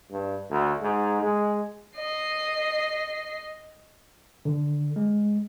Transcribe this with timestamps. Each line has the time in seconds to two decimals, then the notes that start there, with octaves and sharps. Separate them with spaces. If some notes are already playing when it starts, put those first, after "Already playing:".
0.11 G2
0.50 D2
0.81 G#2
1.22 G#3
1.96 D#5 C7
4.45 D3
4.96 G#3